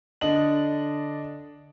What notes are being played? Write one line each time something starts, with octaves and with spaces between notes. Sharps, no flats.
D3 D4 D#5 F#7